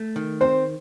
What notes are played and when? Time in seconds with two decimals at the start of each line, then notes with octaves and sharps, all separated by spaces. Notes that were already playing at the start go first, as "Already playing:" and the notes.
Already playing: A3
0.16 D#3
0.41 C4 C5